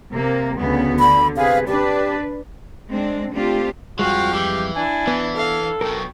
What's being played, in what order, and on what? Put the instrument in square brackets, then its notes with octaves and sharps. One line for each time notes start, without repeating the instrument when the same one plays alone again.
[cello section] C3 A#3
D2 C#3 B3
[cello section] D3 [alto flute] B5
[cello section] C3 G#4 B4 [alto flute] F5
[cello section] D4 B4 [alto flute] G4
[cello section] G#3 C4 D4
A3 C4 D4 F4 G4
[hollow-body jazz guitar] F2 G3 G#3 [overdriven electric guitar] F3 [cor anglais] F#4 [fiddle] F5 G5
[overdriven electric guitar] E3 [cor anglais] G4
[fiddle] D4 E4 [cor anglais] G#5
[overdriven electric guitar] E3 [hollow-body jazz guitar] B3
[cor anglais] A4 [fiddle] F5
[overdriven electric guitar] B1 B2 [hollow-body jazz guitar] A#4 [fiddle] G5